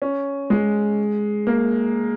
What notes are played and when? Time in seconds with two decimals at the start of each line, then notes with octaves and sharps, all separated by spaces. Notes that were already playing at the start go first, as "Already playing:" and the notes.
0.02 C#4
0.50 G#3
1.47 A#3